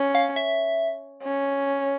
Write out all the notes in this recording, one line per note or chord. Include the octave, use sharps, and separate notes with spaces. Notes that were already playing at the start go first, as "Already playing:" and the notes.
Already playing: C#4
F5
E5
C#4